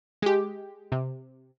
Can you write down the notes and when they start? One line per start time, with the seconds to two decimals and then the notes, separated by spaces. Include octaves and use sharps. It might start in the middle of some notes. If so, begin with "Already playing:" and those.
0.22 G#3 G4
0.92 C3